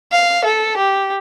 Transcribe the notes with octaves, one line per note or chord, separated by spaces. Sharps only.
F5
A4
G4